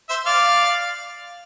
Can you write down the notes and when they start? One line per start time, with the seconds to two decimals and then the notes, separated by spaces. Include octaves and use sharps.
0.09 C5 E5
0.26 D5 F5